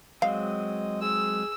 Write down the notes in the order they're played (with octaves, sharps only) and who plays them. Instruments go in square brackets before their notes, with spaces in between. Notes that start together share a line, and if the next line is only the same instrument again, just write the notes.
[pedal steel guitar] F#3 G#3 C4 [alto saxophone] D#5 [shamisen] F5
[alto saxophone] G#4 [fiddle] E6